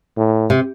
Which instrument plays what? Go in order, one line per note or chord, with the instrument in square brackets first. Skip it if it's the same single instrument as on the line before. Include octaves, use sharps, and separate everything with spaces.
[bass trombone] A2
[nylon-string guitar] C3